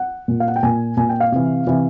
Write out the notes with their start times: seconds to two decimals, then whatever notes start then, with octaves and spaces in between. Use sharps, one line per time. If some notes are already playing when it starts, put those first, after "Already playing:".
Already playing: F#5
0.28 A#2
0.40 F5
0.48 F#5
0.56 G5
0.63 A#2 G#5
0.97 A#2 G#5
1.09 G5
1.20 F5
1.32 C3 E3
1.67 C3 E3